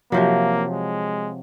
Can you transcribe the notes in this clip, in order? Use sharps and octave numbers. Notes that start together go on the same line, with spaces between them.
C3 F3 F#3 A#3
G#3